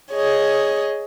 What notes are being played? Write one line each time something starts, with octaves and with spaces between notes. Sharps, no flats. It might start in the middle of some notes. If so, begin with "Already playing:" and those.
G#4 C#5 D#5